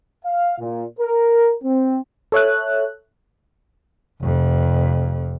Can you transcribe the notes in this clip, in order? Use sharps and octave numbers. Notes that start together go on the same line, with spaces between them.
F5
A#2
A#4
C4
A4 C#5 E5 F#6
F1 F2